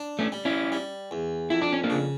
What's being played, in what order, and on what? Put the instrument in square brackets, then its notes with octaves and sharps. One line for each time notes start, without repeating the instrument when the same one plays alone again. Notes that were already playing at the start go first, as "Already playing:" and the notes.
Already playing: [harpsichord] D4
[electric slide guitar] A3 C#4
[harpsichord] G3
[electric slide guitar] C#4 E4
[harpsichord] G3
E2
[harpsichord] F2 [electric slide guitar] E4
[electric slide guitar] D4
C#4
A#3 D4
[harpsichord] C#3